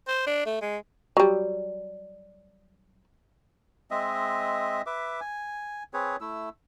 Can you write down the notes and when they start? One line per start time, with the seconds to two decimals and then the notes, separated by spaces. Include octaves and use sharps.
0.08 C5
0.27 D4
0.46 A3
0.62 G#3
1.17 F#3 G3
3.91 G#3 C4 D#5 E5
4.86 B4 E5 D6
5.21 G#5
5.93 C4 G#4 B4 C#5
6.21 A3 E4 E6